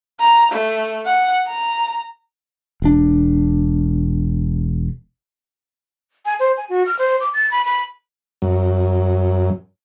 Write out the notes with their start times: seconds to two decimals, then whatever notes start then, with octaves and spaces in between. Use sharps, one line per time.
0.20 A#5
0.51 A3
1.05 F#5
1.47 A#5
2.82 E1 D4
6.25 G#5
6.40 C5
6.57 G#5
6.70 F#4
6.86 F6
6.99 C5
7.21 D6
7.34 A6
7.51 B5
7.65 B5
8.42 F#2